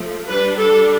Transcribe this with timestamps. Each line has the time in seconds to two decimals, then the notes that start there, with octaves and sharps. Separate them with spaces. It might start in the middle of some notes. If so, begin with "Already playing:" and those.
Already playing: F3 A3
0.27 G3 D4 B4
0.56 A4